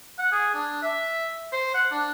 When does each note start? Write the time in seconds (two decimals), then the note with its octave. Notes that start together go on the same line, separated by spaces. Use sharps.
0.18 F#5
0.32 G#4
0.54 D4
0.83 E5
1.52 C5
1.74 F#5
1.92 D4